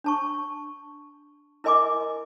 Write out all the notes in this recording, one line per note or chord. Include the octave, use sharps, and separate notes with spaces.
D4 A5 C#6
E4 A#4 D#5 G#5 C6 D6